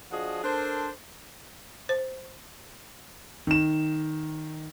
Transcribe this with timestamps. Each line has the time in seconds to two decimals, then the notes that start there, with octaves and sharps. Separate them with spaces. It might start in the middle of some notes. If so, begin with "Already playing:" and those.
0.11 F3 D4 F#4 G#4 D#5
0.43 D4 A4 A#4 C5
1.89 C5
3.47 D#3 E7